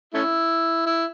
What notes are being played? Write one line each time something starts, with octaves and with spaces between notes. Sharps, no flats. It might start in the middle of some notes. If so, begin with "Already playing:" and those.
A3 C#4 E4
E4